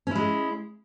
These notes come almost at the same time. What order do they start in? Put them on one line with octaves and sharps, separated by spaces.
C#4 E4 G#3